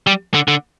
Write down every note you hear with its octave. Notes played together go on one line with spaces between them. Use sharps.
G3
D3
D3